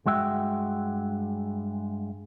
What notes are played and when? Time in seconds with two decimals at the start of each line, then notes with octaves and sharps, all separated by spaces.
0.06 G2 G#3 F#4 E5 G5